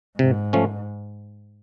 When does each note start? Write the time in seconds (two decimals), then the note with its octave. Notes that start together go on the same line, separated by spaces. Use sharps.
0.19 G#2 C3
0.53 F3 A3 C#4